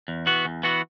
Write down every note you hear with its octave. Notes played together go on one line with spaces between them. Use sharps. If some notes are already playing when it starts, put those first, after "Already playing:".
E2
E3 B3 F#4
E2
E3 B3 F#4